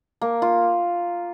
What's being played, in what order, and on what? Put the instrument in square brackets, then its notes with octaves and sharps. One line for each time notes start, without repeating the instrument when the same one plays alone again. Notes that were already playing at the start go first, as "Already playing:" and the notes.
[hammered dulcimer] A#3
F4